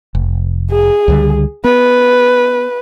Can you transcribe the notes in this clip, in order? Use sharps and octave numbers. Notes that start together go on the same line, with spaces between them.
F1
G#4
C#2 D3 G3
B3 B4